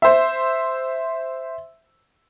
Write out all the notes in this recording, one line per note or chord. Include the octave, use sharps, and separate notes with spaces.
C5 E5